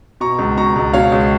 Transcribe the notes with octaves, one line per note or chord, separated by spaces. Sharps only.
B2 A#5 C#6
C#2
B2 A#5 C#6
C#2
B2 C#5 F5
C#2